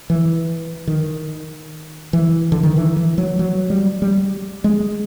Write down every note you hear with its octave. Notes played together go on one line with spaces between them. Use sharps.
E3
D#3
E3
D3
D#3
E3
E3
F#3
F#3
G3
G3
G#3